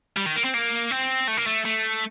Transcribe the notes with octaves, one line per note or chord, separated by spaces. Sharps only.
G3
D#3
A#3
C4
A#3
C4
A3
A#3
A3
A3